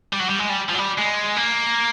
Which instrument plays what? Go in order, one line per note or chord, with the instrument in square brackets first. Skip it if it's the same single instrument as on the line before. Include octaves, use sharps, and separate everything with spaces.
[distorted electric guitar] G3
F#3
G3
G#3
G3
F3
F#3
G3
G#3
A#3